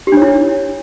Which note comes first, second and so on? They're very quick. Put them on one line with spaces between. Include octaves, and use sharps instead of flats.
G4 D4 C#5 E4